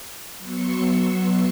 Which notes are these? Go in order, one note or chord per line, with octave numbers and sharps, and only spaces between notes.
F#3 B3 C6 C#6 E6 C#7